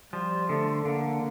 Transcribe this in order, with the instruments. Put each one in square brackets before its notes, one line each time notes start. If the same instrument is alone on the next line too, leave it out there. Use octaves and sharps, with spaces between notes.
[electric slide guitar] F3 [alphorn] G3
[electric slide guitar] D3 [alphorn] A3
[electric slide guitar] D3 [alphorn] A#3